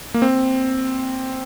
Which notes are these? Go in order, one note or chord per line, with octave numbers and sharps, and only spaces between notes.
A#3
C4